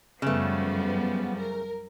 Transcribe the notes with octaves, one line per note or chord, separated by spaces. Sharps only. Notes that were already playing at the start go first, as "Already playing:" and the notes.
F#2 C#3 F3 G3 A3 B3
A#4